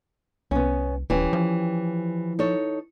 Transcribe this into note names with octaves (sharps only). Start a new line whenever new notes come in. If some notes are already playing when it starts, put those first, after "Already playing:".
C2 B3 C#4
D#1 E3 C#4 G4
F3
D#4 A4 C#5